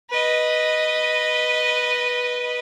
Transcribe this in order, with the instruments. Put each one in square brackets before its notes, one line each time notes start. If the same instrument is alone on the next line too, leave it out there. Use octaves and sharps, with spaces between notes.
[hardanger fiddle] B4 D#5